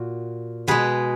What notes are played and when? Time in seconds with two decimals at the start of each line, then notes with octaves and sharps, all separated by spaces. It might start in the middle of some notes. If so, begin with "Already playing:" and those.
Already playing: A#2 F#4
0.68 B2 G#3 G#4 B4